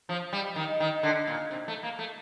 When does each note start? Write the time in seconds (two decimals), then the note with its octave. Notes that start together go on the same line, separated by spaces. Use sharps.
0.09 F3
0.33 G3
0.56 D#3
0.80 D#3
1.03 D3
1.27 A#2
1.51 C3
1.68 A3
1.83 A#3
1.99 A3